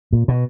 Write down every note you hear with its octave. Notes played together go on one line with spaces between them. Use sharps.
A#2
B2